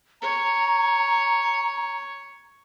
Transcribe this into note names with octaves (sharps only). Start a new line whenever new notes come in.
C#5 A#5